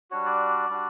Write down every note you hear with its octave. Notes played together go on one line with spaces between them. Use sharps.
G3 D4 F#4 C#5
D5
G3 D4 F#4